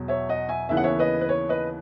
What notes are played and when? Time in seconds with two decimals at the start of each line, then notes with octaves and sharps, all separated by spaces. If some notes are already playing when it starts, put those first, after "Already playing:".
Already playing: E2 B2 F#3
0.08 C#5 E5
0.29 D#5 F#5
0.49 E5 G#5
0.69 D#2 C#3 E3 B3 E5
0.77 F#5
0.84 C#5 E5
0.99 B4 D#5
1.21 B4
1.29 C#5
1.49 B4 D#5